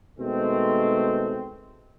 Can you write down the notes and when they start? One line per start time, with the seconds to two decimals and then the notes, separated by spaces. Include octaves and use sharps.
0.20 B2 D#3 G#3 A3 C4